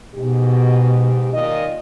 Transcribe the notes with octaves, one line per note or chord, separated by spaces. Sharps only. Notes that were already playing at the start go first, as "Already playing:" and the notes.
G#2 B2 G4
A#2 D#3 D#5